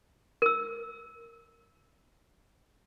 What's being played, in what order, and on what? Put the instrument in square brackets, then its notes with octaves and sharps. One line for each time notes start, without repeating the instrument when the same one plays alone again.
[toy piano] A#4 E6